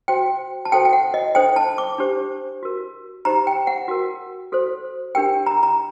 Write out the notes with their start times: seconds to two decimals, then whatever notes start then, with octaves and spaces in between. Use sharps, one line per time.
0.08 F#4 C5 G5
0.65 A5
0.72 F#4 A4 C5 G5
0.85 G5
0.93 F#5
1.14 D#5
1.35 D4 A4 C5 G5
1.56 A5
1.78 D6
1.98 D4 G4 C5
2.63 F#4 A#4
3.25 D#4 G4 C5 A#5
3.47 G5
3.67 F#5
3.88 F#4 A#4
4.52 F#4 A4 C5
5.15 D4 G4 A#4 G5
5.47 A#5
5.63 A#5